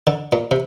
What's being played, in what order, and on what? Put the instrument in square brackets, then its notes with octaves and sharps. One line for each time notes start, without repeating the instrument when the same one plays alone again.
[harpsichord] D3
A#2
C3